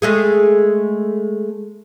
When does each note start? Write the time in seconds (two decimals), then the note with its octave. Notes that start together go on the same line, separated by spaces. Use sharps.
0.02 G#3 A3 G#4